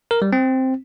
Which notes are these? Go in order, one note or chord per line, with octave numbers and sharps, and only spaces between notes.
A#4
G3
C4